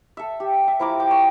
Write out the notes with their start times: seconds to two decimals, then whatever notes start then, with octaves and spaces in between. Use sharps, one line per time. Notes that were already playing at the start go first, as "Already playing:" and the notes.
0.17 A4 E5
0.40 G4
0.68 E5
0.80 F3 E4 A#4 D6
1.00 G5 D6
1.11 C#5